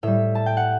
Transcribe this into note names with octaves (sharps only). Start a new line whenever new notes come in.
A2 G3 E5
A5
G5
F#5